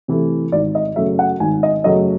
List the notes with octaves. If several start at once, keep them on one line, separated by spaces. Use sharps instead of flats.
C3 E3 A3
G#1 D5
D#5
F#2 C#3 F#3 A3 E5
F#5
G#1 G#5
D#5
F#2 C#3 F#3 A3 D#5